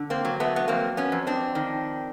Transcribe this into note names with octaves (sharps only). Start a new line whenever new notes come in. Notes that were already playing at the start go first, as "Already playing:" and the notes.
Already playing: D3
A#3 C4
F#3
A3 B3
B3
F2 A#3 C4
B3 C#4
F2
C4 D4
D#3